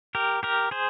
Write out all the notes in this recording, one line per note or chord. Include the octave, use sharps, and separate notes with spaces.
G4 A#4
G4 A#4
G#4 C5